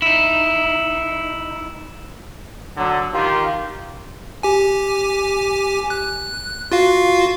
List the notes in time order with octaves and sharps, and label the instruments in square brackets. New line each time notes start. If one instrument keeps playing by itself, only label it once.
[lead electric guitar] D#4 E4
[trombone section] D3 F#3
D#3 F4 G4
[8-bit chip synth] G4 G#5
F#6
F4 F#4 F5